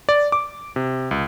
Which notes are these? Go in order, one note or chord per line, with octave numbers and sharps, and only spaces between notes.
D5
D6
C3
C#2